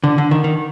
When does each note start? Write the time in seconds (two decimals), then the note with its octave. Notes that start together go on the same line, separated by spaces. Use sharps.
0.04 D3
0.18 D3
0.31 D#3
0.44 D#3